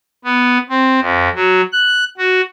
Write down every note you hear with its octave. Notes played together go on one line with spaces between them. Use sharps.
B3
C4
F2
F#3
F#6
F#4